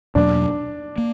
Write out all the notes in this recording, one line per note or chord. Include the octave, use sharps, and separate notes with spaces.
E2 B2 F#3 A#3 D4
A#3